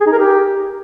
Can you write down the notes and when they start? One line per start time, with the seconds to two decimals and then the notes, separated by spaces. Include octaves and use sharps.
0.01 G#4
0.06 D#4
0.12 A#4
0.18 G4